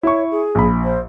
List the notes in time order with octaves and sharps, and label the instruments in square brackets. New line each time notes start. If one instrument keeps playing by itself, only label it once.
[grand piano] E4 C#6 [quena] C#5
[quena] G#4
[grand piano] A#1 B5
[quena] C5